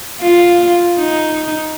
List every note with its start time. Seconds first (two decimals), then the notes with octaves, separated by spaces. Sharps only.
0.22 F4
0.98 D#4